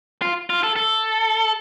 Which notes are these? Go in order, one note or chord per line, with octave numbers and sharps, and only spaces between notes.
F4
F4
A4
A4